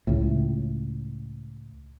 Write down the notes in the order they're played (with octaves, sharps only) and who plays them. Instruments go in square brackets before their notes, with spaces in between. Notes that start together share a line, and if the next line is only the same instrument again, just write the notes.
[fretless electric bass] C#2 A2